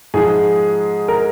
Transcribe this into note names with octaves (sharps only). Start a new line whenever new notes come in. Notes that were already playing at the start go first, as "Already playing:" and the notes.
G#2 F3 G#3 G#4
A#4